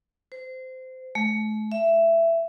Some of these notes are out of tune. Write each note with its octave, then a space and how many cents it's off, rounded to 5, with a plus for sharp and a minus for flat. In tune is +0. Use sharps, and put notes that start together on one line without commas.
C5 -20
A3 -40
E5 +15